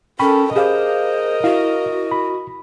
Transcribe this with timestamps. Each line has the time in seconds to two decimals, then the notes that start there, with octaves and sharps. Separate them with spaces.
0.19 C#4 A4 A#4 G5 B5 C#6
0.56 G4 G#4 A#4 C5 D#5 F5 D6
1.44 E4 F#4 F5
2.11 B5